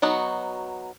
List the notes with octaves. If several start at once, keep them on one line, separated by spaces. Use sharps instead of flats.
F#3 B3 D#4 F#4